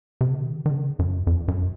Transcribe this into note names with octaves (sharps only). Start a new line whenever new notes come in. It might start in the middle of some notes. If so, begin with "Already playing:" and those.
C3
C#3
D#3
D#3
C#3
F#2
F2
F#2